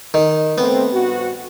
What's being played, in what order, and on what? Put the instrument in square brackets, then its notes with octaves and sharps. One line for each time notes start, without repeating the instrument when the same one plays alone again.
[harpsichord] D#3
[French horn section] A3 C4 [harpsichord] B3
[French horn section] G2 F#4